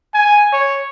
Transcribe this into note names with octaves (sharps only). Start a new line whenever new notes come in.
G#5
C#5